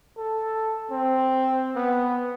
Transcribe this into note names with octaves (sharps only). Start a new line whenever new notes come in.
A4
C4
B3